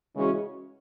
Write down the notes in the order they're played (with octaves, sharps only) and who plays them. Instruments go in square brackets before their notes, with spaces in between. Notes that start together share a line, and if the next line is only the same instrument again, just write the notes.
[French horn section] C#3 E3 G#3 C#4 F#4